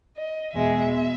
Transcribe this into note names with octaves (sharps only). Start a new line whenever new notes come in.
D#5
E2 B2 G#3 E5